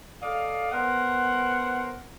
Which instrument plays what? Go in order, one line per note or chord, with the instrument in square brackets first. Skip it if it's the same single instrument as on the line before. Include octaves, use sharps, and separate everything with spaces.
[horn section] A4 D5 D#5 F5
B3 A#4 C5 F#5